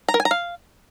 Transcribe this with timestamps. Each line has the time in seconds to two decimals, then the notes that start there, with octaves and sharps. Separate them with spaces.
0.08 A#5
0.14 A#4
0.20 G#5
0.25 A#5
0.31 F5